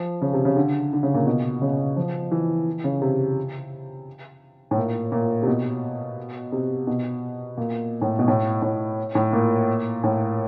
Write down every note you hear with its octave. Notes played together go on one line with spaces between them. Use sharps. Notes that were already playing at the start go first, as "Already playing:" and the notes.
Already playing: F3
C#3
C3
C#3
D3
D3
C#3
A#2
B2
C#3
F3
E3
C#3
C3
A2
A#2
A#2
C3
B2
C3
B2
A#2
A2
B2
A2
A2
A2
A#2
A2